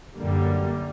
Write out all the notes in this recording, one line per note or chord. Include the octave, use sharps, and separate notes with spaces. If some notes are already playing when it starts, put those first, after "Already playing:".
F#2 D3 G3 A#3